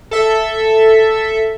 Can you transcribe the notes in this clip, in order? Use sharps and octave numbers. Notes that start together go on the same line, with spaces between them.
A4 E5